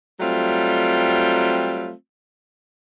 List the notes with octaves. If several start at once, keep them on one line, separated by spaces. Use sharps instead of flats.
F#3 G3 A3 C4 F4